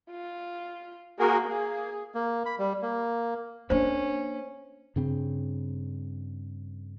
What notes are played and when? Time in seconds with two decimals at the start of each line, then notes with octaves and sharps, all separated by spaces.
0.11 F4
1.19 A#3 F#4 G#4 A#4
1.48 A#3 G#4
2.14 A#3
2.46 B5
2.59 G3
2.82 A#3
3.70 A#3 C#4 D4 C5
4.96 G2 C#3 C4